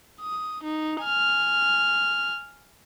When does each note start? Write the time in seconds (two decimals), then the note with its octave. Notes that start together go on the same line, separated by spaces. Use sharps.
0.21 D#6
0.64 D#4
1.02 G#5 F6